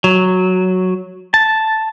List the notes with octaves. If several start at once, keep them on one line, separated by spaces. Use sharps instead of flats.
F#3
A5